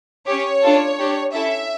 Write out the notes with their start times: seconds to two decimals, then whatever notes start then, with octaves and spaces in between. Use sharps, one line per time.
0.26 C#4 G4 C#5
0.62 D4 F4 A4
0.99 D4 G4
1.33 C#4 E4 A4 E5